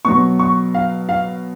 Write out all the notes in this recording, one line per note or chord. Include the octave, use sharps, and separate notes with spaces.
B2 F#3 C#6
C#6
F5
F5